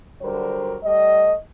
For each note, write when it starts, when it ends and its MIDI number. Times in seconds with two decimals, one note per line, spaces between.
0.22 0.77 50
0.22 0.77 54
0.22 0.77 55
0.22 0.77 70
0.22 0.77 72
0.83 1.33 55
0.83 1.33 57
0.83 1.33 75